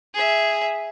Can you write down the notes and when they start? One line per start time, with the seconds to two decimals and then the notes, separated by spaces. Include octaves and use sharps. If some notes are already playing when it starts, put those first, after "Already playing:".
0.14 G#4 E5